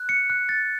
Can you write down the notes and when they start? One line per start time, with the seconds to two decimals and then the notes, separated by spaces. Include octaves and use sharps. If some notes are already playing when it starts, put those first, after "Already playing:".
Already playing: F#6
0.09 C#7
0.30 F#6
0.49 A6